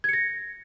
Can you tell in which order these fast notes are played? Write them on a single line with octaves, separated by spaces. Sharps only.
G#6 C#7 A#6